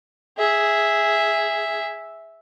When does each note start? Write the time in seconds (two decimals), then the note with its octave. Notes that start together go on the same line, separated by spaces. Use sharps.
0.37 G#4 E5